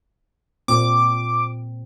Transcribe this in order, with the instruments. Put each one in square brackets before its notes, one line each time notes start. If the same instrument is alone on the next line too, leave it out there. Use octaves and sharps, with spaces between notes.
[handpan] A#2 C4 [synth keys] D6